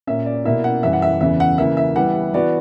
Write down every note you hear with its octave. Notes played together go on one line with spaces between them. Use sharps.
A#2 A#3 C#4 E5
D5
B2 A#3 E4 E5
F#5
F#2 E3 G3 E5
F#5
E5
E2 C#3 E3 E5
F#5
C#3 E3 A#3 E5
E5
E3 G3 B3 F#5
E3 B3 F#4 D5